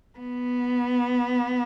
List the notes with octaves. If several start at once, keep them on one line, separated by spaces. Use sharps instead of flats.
B3